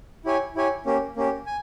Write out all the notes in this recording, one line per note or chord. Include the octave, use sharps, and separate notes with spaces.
E4 G4 C#5 G#5
E4 G4 C#5 G#5
A#3 C#4 G4
A#3 C#4 G4
G#5